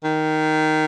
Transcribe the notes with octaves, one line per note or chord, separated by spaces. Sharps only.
D#3